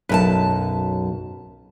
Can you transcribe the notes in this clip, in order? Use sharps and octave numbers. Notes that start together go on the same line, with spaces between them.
B1 F#2 A4 B4 A5